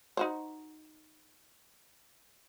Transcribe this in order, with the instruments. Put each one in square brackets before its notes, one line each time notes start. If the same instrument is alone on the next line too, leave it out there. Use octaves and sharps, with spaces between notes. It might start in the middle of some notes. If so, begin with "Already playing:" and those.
[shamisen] D#4 F#4 C5